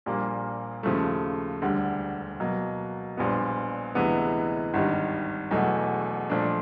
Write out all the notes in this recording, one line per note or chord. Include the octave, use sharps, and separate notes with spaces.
A#1 A#2 G3 A#3
D#2 C#3 F3 A3
E1 D2 D3 G3
B2 F#3 A#3
A#1 A#2 G3 B3
D2 C3 E3 G#3 B3
G#1 G2 D#3 G3
E1 E2 B2 F#3 A3
A#2 F3 A3 D4